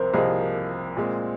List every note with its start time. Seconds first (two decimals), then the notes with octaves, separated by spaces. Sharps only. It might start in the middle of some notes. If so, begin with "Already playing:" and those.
Already playing: C2 C3 F3 A#4 C5
0.13 C2 C3 F3 A#3 G#4 A#4 D#5
0.97 A#2 G#3 C4